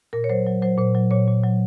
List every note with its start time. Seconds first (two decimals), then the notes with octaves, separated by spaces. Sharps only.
0.13 A#2 A#4
0.24 C#5
0.30 F#3 C5
0.47 F#3
0.62 F#3 C5
0.78 A#2 C5
0.95 F#3
1.11 A#2 C#5
1.28 A#2
1.44 F#3